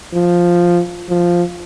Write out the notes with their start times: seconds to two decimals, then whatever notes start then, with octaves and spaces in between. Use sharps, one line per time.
0.14 F3
1.09 F3